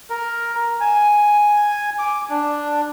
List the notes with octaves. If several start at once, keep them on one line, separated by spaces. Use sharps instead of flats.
A#4
G#5
D6
D4